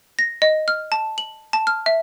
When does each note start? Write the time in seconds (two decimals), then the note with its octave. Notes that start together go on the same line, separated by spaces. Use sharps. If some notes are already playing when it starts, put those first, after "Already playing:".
0.19 A#6
0.42 D#5
0.68 F6
0.92 A5
1.18 F#7
1.53 A5
1.67 F6
1.86 E5